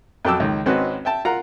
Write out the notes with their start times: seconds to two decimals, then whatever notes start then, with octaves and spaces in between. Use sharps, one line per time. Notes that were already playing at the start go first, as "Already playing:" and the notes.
0.25 F2 F#3 G5 A5 D6 E6
0.40 C#2 D#3
0.66 G#1 C4 C#4 F#4 B4 D#5
1.05 E5 G5 A5
1.25 F4 A#4 F#5 A#5